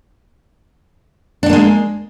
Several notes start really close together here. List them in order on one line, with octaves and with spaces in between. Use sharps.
D4 G3 A#3 G#3